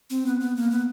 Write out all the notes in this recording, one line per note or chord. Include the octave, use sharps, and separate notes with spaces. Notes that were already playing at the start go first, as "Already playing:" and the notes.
C4
B3
B3
A#3
B3